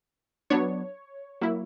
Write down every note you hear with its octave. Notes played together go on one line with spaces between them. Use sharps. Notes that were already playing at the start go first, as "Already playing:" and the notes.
F#3 B3 D4 C#5
F#3 A#3 E4